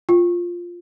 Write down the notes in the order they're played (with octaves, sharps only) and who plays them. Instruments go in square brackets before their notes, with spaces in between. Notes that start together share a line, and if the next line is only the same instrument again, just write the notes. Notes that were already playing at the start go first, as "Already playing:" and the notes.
[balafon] F4